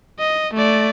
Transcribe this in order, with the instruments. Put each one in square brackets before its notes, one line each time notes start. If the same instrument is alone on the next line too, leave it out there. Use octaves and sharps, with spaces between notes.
[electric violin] D#5
A3 D5